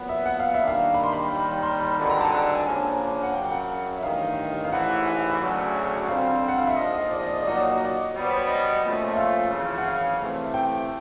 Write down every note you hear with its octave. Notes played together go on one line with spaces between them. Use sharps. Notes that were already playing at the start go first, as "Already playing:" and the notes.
Already playing: A#2 F#3 B3
E5
F#5
F5
E5
D#3 G3 A#3 D4
F5
B5
C6
B5
D#2 D#3 G3
C6
B5
G#1 G2 D3 B5
A#5
A5
A#5
A5
G#5
C#3 F3 A#3 D4 G#5
F#5
F#2 C#3 F#3 G5
G5
F#5
E5
A1 G2 D#3 F5
F5
A1 G#2 E3 F#5
D2 C#3 F#3
F2 D3 G3 C4 F5
F#5
F5
E5
A#1 G#2 F3 D#5
D#5
D5
D#5
D5
D#5
D5
A#2 F#3 A#3 D#4 F#4 D#5
D5
D#5
D5
D#5
D5
B2 G3 B3 C#5
C5
C#5
D#5
A#2 F3 A3 C#4 F4
E5
F5
G#1 F#2 C#3 E3
F#5
F5
C3 E3 A3
G5